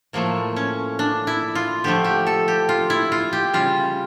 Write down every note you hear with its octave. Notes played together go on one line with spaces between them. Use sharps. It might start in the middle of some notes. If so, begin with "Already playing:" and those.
A2 F3 A3 A#3
C#4
D4
E4
F4
D3 F3 A3 G4
G4
A4
G4
F4
E4
F4
G4
C#3 G3 F4